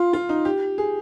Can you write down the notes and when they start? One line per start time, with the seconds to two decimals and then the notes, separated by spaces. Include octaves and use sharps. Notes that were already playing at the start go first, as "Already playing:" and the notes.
Already playing: F4
0.13 F4
0.29 D#4
0.45 G4
0.78 G#4